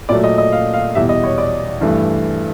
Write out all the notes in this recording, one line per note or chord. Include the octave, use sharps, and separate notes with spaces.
A#2 F#3 A3 D5
D#5
D#5
F5
F5
E2 B2 G3 E5
D#5
C#5
D5
G2 E3 A3